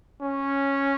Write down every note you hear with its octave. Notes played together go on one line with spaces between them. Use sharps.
C#4